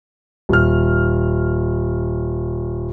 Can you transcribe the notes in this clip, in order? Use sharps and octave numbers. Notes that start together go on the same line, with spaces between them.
D#1 F6